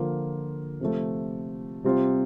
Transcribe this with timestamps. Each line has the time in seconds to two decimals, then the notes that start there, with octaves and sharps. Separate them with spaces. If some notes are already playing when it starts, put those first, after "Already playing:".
Already playing: D3 F3 A#3 F4
0.80 C3 F3 A3
1.84 C3 G3 C4 F4